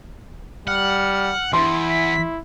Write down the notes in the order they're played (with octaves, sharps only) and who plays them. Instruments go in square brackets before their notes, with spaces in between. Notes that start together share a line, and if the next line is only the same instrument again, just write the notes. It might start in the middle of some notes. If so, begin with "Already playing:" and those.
[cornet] G3 [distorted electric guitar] F#5 [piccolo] F6
[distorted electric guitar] E2 [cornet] E4 [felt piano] C6
[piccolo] B6